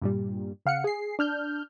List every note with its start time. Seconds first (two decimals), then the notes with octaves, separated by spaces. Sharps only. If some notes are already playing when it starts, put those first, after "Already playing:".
0.02 G2 A#2 G3
0.66 C#3 F5 F#5 C#7
0.84 G#4 C7
1.19 D4 F6 G6